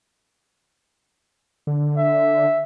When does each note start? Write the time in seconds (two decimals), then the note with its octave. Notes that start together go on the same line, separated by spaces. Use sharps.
1.67 D3
1.98 E5